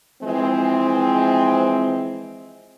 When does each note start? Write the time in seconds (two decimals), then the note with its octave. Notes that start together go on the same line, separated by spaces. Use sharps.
0.23 E3 F3 G#3 C4